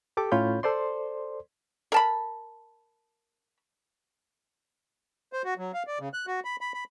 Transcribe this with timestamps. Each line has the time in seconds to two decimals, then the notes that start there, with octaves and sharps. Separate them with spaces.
0.17 G4 A4 D6
0.32 A2 C#4 F4 C#5 B5 G6
0.63 A4 C5 D5 C6
1.92 A#4 A5 B5
5.33 C5
5.44 F#4
5.58 F#3
5.74 F5
5.87 D5
6.00 C#3
6.14 F#6
6.27 F#4
6.45 B5
6.61 B5
6.74 B5